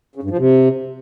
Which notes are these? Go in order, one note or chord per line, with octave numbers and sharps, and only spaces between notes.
C#3
G2
F3
C3